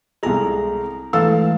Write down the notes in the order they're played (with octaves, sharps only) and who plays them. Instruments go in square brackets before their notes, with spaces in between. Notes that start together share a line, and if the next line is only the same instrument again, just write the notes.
[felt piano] C2 G#3 [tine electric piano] A4 A#5
[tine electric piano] E3 G#3 A3 [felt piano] A4 F5 E6